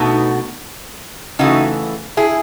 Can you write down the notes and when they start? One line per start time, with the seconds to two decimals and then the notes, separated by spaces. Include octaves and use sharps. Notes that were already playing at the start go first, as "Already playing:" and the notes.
Already playing: B2 A3 B3 D#4
1.39 C#3 E3 A3 D#4 F#4
2.17 E4 G#4